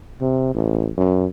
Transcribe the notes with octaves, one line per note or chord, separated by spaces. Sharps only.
C3
A1
F#2